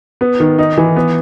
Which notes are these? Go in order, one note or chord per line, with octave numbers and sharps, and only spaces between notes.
B3
D#3
D#4
E3
B3